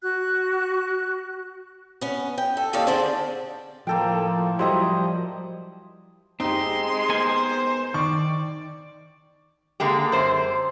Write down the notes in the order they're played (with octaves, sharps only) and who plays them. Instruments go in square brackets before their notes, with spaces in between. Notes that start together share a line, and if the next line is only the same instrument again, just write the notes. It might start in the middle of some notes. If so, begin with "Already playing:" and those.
[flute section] F#4 F#6
[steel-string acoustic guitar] B3 C#4
G5
A4
D#2 D#3 A4 C#5 D5 F5
D3 D4 F4 G#4 C5 D5
[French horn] A2 [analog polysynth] F3 [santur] A#3 A4 G5
[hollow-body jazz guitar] F#3 E4 G4 [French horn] G3 [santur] C5 D#5 A#5
[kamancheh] G#3 C6 [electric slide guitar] C4 [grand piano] D#4 G4
[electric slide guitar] B3 A#4 G#5 [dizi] C5
[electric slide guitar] D#3 [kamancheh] D5 [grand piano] C#6
[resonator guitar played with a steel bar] D3 G#3 A#3 G4
F#2 C5